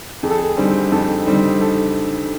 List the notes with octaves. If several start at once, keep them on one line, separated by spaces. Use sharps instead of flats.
F2 G#4
A4
G#4
D3 G3 C4 D#4
F2 A4
D3 G3 C4 D#4
A4